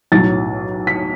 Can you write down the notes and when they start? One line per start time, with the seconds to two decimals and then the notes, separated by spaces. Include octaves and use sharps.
0.12 B1 A2 F#3 A6
0.87 B6